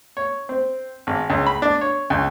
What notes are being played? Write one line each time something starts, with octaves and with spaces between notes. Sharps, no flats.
C#5
C4
G#1
C#2
B5
D4
C#5
C#2